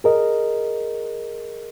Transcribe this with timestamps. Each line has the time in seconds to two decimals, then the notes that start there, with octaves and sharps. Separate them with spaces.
0.04 G#4 A#4 D#5